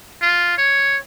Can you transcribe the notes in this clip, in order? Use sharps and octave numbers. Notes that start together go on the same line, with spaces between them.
F4
C#5